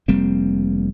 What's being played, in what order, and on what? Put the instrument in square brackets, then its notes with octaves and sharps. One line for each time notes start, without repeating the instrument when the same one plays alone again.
[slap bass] F1 G3 A#3 C4